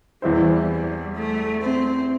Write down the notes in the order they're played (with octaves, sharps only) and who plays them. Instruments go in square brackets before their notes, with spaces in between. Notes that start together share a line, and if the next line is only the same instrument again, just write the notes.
[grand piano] E2 E3 C4 E4 C5 [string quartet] G3
[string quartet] A3
C4